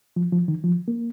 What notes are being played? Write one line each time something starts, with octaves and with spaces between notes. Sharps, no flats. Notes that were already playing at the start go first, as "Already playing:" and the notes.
F3
F3
D#3
F3
A#3